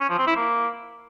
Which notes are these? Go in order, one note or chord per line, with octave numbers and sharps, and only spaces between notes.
C#4
F3
C4
E4
A#3